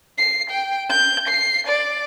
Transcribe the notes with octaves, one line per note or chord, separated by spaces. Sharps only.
C7
G5
G6
C7
D5